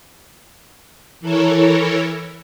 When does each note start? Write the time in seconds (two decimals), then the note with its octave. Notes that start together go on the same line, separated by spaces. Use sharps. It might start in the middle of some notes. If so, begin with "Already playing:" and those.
1.20 E3 E4 A4 A#4 C#5